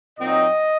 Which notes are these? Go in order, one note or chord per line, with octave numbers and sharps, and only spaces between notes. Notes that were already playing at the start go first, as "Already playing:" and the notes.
A#2 F#3 C4 D#4 D#5